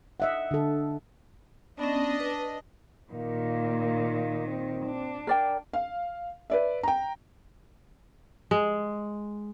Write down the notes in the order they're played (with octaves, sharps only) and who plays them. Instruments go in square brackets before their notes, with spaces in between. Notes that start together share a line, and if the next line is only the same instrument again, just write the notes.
[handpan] D#5 E5 F#5
D3 A4
[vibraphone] B3 C#4 [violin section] D4 D#5
[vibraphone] B4
[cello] A#2 D#3 [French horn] A#3
[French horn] C4
[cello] D4
[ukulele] A#4 D5 G5
[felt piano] F5
B4 D5 E5
G5 A#5
[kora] G#3